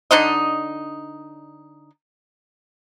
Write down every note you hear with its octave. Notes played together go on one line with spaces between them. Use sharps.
D3 D4 D#4 D#5